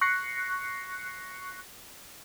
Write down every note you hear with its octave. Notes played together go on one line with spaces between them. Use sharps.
C#6 F#6 A#6 C7 C#7